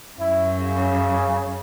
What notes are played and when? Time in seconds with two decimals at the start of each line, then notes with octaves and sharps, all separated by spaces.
0.20 F#2 E4
0.61 C#3